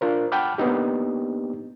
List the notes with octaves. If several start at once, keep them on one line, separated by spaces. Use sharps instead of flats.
D4 F4 A#4 C5
F#5 G5 A5 B5 D6 F6
A#3 B3 D4 D#4 G4